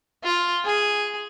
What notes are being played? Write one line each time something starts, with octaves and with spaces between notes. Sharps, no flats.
F4
G#4